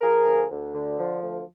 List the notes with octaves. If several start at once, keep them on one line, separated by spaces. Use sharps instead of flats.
F3 G#4 A#4
D2
D2
D3
F3
D2